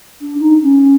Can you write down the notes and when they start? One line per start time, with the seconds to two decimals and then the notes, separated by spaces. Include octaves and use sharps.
0.21 D4
0.39 D#4
0.62 C#4